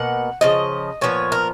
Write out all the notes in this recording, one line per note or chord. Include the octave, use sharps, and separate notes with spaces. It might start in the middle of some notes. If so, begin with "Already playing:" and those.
Already playing: B2 A#3 F#5
C#3 F3 D#5
A#2 F3 B3 C#5
A#4